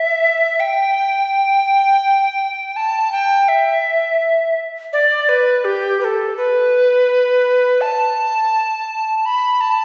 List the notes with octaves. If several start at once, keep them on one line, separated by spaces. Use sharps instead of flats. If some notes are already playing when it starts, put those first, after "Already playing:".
Already playing: E5
G5
A5
G5
E5
D5
B4
G4
B4
A4
B4
A5
B5
A5